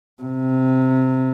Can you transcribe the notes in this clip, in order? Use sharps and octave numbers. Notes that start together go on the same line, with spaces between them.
C3